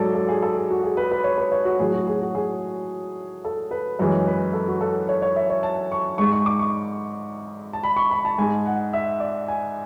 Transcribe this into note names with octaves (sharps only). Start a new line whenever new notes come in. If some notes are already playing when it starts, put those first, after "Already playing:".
Already playing: G#2 F#3 A4 D5
A4
G#4
A4
G#4
F#4
G#4
B4
B4
C#5
B4
C#5
F#4
A2 F#3 G#4
F#4
G#4
F#4
G#4
A4
B4
F#2 E3 G#3 C#5
B4
A4
F#4
A4
C#5
C#5
E5
C#5
A5
C#6
G#2 G#3 C#6
C#6
D6
C#6
A5
B5
C#6
B5
A5
G#2 G#3 G#5
F#5
E5
D5
G#5